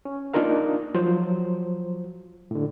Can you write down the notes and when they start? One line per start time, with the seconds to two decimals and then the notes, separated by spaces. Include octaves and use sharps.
0.05 C#4
0.34 A#3 D4 D#4 F4 A#4 F5
0.95 F3 F#3 C5
2.51 A2 D3